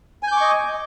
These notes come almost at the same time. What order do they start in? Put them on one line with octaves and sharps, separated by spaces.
G#5 G6 D6 C#6 D#5